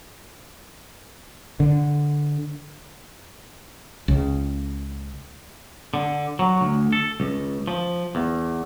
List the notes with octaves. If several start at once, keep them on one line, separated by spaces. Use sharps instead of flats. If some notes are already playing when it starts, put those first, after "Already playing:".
D3
C#2 C#3
D3
F#3
D2
A4
C#2
F3
E2